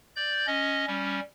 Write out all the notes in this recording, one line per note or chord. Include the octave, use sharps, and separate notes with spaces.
D5 G6
C#4 D#5
G3 C#4